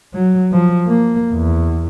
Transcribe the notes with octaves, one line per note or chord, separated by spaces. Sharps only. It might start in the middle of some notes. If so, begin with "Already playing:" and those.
F#3
F3
A#3
E2